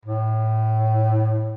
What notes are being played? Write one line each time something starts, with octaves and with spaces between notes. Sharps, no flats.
A2